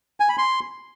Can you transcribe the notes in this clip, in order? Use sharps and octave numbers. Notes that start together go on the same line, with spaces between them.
G#5
B5
C6